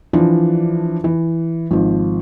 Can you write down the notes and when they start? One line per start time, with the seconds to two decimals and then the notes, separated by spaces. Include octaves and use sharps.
0.13 E3 F3 D4
1.04 E3
1.71 G#1 F3